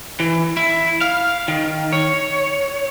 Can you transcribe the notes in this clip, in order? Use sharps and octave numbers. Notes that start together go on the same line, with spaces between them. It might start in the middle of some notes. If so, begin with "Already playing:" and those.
E3
E4
F5
D#3
C#5